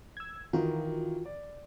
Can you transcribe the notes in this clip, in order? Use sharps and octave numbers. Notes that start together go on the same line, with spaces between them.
E6 G#6
D#3 E3 F4 F#4 A#4
D5